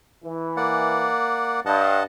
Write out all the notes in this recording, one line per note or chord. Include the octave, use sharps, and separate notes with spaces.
E3
A#3 D5 F#5
G2 D#5 F#5 A5